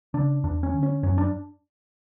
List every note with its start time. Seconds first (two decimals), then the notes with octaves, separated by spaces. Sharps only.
0.14 C#3 D4
0.44 E2 D4
0.63 C#4
0.74 D3
0.83 C#4
1.03 F#2 C#4
1.18 D4